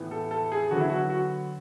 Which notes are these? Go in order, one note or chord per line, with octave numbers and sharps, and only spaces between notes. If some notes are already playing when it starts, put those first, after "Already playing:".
Already playing: A2 E3 B3
A4
A4
G#4
D3 F#3 B3 F#4
E4
F#4
F#4